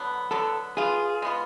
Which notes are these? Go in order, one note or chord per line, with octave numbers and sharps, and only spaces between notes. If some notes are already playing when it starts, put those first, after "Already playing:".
Already playing: D3 F#3 B3
D3 F#3 B3 A4
G#3 B3 F4 G#4
G#3 B3 F4